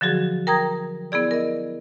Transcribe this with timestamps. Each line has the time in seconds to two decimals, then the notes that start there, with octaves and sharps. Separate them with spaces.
0.01 D3 F3 F#3 F#4 G#4
0.47 A#4 G5 A#5 D#6 G#6 A#6
1.12 B3 E4 G#4 D5
1.31 A#4 D#5